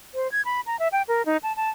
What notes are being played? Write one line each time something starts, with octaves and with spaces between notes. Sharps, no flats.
C5
G#6
B5
A#5
E5
G5
A#4
D#4
A5
A5